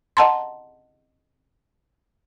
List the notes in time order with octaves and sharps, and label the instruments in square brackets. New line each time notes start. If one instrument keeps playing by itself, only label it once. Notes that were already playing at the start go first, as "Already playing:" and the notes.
[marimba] D#5 F#5 A5 A#5 C6